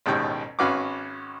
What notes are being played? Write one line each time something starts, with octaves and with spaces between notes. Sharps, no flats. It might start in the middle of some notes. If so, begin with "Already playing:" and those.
A1 D#2 G#2 B2 G4 G5
G#1 C#4 F#4 B4 F5 D6